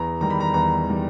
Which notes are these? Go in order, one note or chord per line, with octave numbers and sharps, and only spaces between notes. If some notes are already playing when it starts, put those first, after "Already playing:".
Already playing: E2 A#5
D#3 G3 A#5
B5
A#5
E2 A#5
D#3 G3